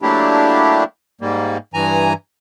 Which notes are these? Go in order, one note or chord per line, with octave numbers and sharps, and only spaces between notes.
F#3 A3 A#3 D4 E4 G4
G#2 G3 A#3
G2 E3 G#5 A#5